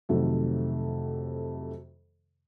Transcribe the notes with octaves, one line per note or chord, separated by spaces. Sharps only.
F2 C3 D#3 F#3 A3